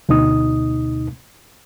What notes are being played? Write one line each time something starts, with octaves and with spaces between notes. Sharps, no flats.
D2 B2 D#4 D#6